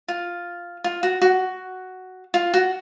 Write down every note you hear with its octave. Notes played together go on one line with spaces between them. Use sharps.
F4
F4
F#4
F#4
F4
F#4